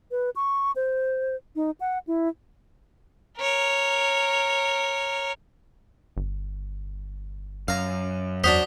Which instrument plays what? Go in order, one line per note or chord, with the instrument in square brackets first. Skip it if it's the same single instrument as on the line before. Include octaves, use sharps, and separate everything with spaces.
[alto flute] B4
C#6
C5
D#4
F#5
E4
[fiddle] A#4 C#5
[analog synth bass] G1
[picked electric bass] F#2 [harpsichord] F5 A#5
[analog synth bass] E2 [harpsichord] D4 F#4 C5 [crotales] D#6 B6 G7